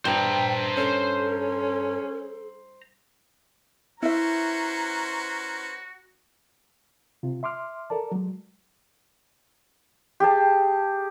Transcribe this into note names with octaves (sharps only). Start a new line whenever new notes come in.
G2 C5 G5 A#5
C#4 A4
C#4 E4 F#4 B4 C5 E5 A#5
C3 F4
E5 C6 D6 F6
A4 A#4 D5 A5
F#3 G#3
G4 G#4 A5